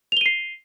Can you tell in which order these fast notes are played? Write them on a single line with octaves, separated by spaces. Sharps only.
F7 G7 D#7 C7